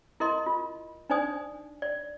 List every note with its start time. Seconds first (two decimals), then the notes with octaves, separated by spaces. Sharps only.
0.20 E4 A#4 D#5 C6
0.46 F4
1.10 D4 D#4 C5 D5 G#5 D#6
1.82 D5